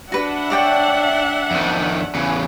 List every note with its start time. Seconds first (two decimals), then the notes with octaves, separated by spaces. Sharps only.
0.12 D4 F#4 B4 E5 F#5
0.50 C#5 D5 G5
1.51 F2 D#3
2.15 E2 C#3 B4